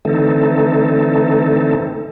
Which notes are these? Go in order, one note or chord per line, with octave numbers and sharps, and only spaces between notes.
D3 E3 A3 C4 D#4 A4